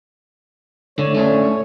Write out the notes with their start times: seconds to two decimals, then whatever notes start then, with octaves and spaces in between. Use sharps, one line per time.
0.99 A2 D3 C#5
1.15 A3 C#4 D4